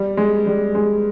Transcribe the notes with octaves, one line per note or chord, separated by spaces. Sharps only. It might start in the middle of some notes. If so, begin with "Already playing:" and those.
Already playing: G3
G#3
G3
G#3